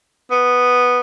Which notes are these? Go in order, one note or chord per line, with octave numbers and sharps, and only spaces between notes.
B3